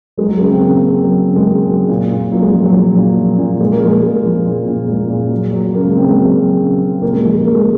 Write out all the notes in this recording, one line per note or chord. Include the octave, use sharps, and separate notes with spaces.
F#3 G#3
F#3
C#3 G#3
C4
C#3 A#3
C#3
F#3
C#3
G#3
C#3 A#3
F#3
A#2
A#2
A#2 F#3
G#3
F3 G#3
F#3
F3
A#2
F3
A#2
A#2 G#3
A#3
F3 G#3
A#2 G#3
F3
A#2
A#2
A#2 G#3
A#2
F#3
F#3
C#3 A#3
G#3
C#3 C4
G#3
F#3
F#3
C#3
C#3
A#2 A#3
G#3
F3 G#3
G#3
A#2 A#3
G#3